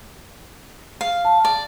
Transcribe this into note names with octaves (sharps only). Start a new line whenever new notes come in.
F5
A5
D5